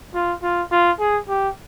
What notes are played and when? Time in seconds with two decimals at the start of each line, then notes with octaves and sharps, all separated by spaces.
0.14 F4
0.43 F4
0.71 F4
0.99 G#4
1.28 G4